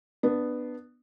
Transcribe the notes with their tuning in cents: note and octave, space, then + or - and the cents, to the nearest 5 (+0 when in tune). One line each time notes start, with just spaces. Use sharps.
B3 +0 D4 +20